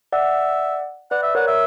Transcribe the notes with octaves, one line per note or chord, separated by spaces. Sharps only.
D5 E5 F#5
B4 D5 F#5
E5
A#4 C#5 F#5
E5